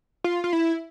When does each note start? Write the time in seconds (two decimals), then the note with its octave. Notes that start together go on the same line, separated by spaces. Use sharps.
0.24 F4
0.44 F4
0.53 E4